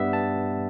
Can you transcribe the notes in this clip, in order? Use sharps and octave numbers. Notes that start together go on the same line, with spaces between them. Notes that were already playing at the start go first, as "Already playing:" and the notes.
Already playing: G2 G3 B3 E5
A5